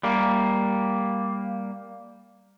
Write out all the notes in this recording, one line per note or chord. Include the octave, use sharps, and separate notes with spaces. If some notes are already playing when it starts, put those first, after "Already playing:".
G3 A#3